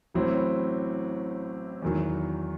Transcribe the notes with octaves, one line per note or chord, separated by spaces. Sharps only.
A1 A2 F#3 C4 E4
E2 D#3 F#3